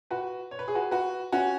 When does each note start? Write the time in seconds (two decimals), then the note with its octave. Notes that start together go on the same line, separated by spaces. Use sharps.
0.11 F#4 B4
0.51 C#5
0.59 B4
0.68 G#4
0.75 F#4 B4
0.91 F#4 B4
1.32 C#4 F#4